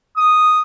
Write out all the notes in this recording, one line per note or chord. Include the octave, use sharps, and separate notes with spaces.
D#6